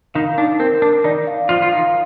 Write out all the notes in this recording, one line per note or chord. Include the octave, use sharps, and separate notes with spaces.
D#3 D#4 F5
D4 D#4
C4 A#4
D4 A#4
D#3 D#4 D5
F5
F3 F4 F5
F4
D#3 D#4 F5